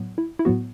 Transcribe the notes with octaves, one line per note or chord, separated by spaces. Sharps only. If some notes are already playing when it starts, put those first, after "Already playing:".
Already playing: A2 F#3 B3
E4
E4
A2 F#3 B3 F#4